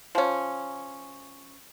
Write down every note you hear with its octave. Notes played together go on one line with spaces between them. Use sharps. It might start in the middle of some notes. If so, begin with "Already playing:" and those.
F3 C#4